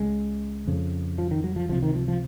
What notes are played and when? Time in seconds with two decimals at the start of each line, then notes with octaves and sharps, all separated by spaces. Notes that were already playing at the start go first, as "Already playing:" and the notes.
Already playing: C#2 C#3 G#3
0.67 F2 C#3
1.18 F3
1.31 D#3
1.44 F#3
1.56 F3
1.69 C#2 C3 F3
1.83 D#3
1.95 F3
2.08 F3